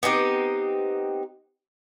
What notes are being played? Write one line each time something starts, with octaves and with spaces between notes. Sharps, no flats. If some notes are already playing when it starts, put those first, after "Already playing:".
B3 C4 D#4 G4